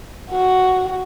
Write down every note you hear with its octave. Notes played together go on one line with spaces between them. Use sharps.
F#4